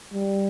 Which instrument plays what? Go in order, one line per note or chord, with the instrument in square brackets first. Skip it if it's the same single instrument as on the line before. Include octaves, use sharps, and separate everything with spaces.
[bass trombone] G3